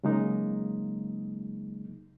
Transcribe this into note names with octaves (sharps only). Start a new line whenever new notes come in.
C#3 F#3 G#3 A#3 D#4